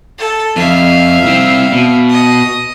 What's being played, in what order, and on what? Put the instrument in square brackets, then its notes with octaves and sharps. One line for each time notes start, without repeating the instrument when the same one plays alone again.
[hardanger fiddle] A4
[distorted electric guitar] F2 [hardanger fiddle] E5 F5
[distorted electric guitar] C2 C4
B2
[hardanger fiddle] D#5